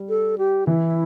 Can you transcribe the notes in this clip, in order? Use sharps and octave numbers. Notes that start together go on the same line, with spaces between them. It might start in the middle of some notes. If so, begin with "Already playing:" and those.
Already playing: G3
A4
G4
E3 E4